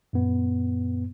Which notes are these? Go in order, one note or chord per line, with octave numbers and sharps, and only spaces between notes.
F#2 A#2 B3